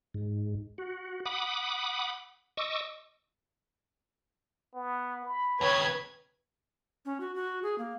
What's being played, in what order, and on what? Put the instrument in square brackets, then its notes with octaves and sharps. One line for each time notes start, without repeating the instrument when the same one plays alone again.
[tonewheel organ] G#2
F#4
F#5 B5 D6 D#6
D#5 C#6 D6 E6
[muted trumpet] B3
B5
[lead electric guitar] D#2 C#3 [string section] B4 G#6 [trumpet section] C#5
[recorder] C#4
F#4
F#4
G#4
A#3